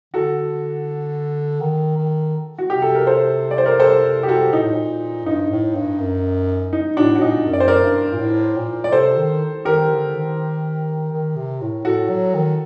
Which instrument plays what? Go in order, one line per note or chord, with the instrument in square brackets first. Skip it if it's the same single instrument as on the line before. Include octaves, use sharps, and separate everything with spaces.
[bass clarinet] D3 [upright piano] F#4 A4
[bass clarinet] D#3
D#3
[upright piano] F#4
[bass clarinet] C3 [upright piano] G4
[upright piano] A4
A#4
A4 C5
D5
C5
A#4 D5
A4 C5
G4
F#4 A4
[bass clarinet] A#2 [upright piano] D#4
[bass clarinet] A2
A#2
[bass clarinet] G2 [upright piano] D#4
[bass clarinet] A2
G2
F#2
[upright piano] D#4
[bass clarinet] A2 [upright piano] D4 F#4
[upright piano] F#4
[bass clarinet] A#2 [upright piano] D#4
[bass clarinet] F#2
[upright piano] D5
C5
A#4 D5
[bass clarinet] G2
A#2
A2
A#2
[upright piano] D5
[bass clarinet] C3 [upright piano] A4 C5
[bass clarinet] D#3
[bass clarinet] D#3 [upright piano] G4 A#4
[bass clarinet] D3
D#3
D#3
C3
A2
[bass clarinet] A2 [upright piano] F#4 A4
[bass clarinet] F#3
D#3